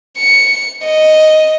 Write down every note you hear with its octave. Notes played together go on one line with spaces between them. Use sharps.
C#7
D#5